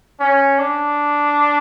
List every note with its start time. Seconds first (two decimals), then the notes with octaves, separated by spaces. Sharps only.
0.20 C#4
0.59 D4